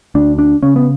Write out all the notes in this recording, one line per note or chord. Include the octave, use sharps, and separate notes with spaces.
D2 D4
D4
C#3 C#4
B3